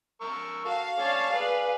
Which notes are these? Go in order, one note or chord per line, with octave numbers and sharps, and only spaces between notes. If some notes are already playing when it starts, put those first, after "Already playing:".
A#4 C#6 E6
F#4 A4 F5
C#4 A4 C#5 D5 A5
G#4 B4 D5